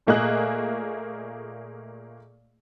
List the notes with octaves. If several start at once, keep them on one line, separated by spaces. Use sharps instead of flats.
A#2 A3 A#3 G#4 D#5 F#6